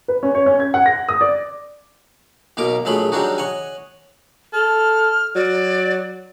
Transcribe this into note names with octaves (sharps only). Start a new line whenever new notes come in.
B4
C#4
C#5
C#4
G#6
F#5
A#6
D#6
D5
B1 B2 A#3 A#4 D6
A#1 F#3 A3 G#4 B5
F#3 G3 D4 D#4 F#4 G#4
C#5 D#5 F#5 G#5
A4 F6
F#3 D5